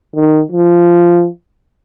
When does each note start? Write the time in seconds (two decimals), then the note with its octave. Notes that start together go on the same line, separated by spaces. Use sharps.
0.16 D#3
0.52 F3